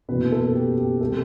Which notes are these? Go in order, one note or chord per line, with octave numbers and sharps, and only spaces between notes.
F#1 E2 B2 B4
A4
G4
G4
C3 G3 A4